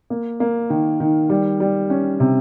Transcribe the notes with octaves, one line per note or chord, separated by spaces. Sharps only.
A#3
A#3
D#3
D#3
G3
G3
C#4
C3